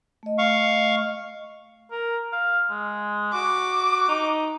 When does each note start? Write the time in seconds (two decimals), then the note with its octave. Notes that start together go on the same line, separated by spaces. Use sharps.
0.23 A3 D#5
0.38 F5 C#6
1.91 A#4
2.32 F5
2.70 G#3
3.33 F#4 D6
4.08 D#4